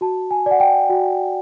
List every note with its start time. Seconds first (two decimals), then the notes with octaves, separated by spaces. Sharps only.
0.01 F#4 A5
0.31 G#5
0.46 D5 F#5
0.60 G5
0.89 F#4